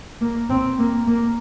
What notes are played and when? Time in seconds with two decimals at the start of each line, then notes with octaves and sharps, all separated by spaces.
0.21 A#3
0.50 C4
0.79 A#3
1.07 A#3